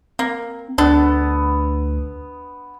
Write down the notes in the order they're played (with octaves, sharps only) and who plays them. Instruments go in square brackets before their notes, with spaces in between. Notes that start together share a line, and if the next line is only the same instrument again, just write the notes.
[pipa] A#3 [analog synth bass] C4
[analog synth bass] D2 [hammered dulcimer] B3 [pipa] D4 A4